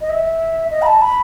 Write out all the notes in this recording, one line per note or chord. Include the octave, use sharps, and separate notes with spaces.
D#5
E5
D#5
B5
A5
B5